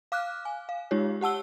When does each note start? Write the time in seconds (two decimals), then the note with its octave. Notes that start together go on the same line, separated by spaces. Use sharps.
0.12 F5 D6 F6 F#6
0.45 G#5
0.69 F5
0.91 G#3 D#4 F4 G4 C#5
1.21 G4 F#5 A5 E6 G7